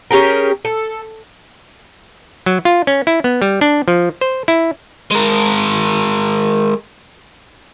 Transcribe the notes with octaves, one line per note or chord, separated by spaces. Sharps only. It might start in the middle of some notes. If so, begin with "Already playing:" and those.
C#4 G4 G#4 A#4
A4
F#3
F4
C#4
E4
B3
G3
D4
F3
C5
E4
G#3 A#4